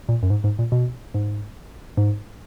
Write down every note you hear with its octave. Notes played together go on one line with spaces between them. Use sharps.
A#2
F#2
G#2
G#2
A#2
B2
G#2
G#2